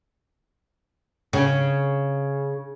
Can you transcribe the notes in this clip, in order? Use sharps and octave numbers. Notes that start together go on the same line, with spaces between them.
C#3